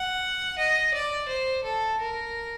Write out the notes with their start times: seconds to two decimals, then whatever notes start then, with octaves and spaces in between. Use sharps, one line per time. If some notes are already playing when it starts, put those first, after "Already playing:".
Already playing: F#5
0.58 D#5
0.94 D5
1.28 C5
1.63 A4
2.00 A#4